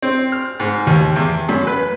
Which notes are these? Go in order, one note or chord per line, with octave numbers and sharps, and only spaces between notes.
C4
F6
G#2
D#2
E2
F#2
B4